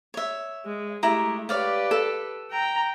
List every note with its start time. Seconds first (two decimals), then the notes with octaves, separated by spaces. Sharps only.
0.14 C#5 E5
0.65 G#3
1.03 G#3 A3 E4 G4 A#5
1.49 G4 B4 C#5 D5 F5
1.91 A4
2.51 G5 A#5